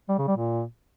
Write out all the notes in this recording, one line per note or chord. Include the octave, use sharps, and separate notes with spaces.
G3
C#3
G3
A#2